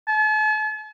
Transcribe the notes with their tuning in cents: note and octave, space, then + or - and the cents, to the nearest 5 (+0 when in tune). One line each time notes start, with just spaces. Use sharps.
A5 -45